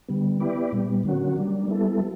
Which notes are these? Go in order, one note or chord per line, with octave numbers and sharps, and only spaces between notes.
D3 G3 B3
B3 E4 G4 B4 D5
A#2 G3 B3
D3 F#3 A#3 C#4 F#4
G3 A#3 D4
G3 B3 E4 A4
F#3